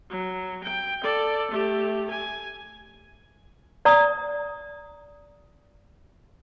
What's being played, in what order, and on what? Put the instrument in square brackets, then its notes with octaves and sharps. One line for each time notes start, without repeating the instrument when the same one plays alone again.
[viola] F#3
G5
A4 D5
A3 G4
G#5
[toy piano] D5 A#5 D#6